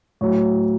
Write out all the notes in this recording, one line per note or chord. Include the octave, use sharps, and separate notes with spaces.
A2 F#3 C#5